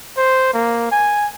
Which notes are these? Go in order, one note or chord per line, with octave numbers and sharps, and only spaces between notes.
C5
A#3
G#5